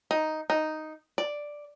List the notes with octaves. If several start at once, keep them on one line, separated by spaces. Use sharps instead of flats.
D#4
D#4
D5